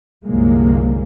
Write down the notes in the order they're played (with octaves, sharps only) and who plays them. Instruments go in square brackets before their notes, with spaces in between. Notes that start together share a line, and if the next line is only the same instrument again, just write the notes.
[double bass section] C2 F#2 D3 F3 G#3 A#3